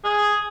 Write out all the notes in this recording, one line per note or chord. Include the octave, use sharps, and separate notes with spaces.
G#4